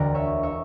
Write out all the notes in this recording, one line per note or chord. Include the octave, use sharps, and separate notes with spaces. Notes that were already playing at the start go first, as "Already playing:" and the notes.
Already playing: E1 D2 D3 A#4
C#5 E5
C#5 E5